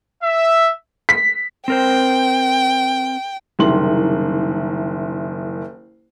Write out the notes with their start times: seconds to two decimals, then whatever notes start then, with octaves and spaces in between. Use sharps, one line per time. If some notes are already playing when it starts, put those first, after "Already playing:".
0.23 E5
1.09 B6
1.68 C4 A#4 C5 G5
3.59 F#1 C2 D#3 C6 F#7